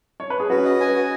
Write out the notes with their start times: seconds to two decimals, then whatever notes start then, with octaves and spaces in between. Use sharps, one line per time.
0.20 C#5
0.30 B4
0.40 G#4
0.50 C#4 F#4 B4
0.65 D#5
0.80 G#5
0.95 F#4